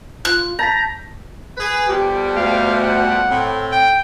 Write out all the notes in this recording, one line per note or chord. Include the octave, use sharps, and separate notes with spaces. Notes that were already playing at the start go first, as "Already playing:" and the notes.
F4 F#6
A5 A#5 G6 A6 B6
G#4 B4
F2 B2 G3 G4
D2 F5
F#5
A2 C4
G5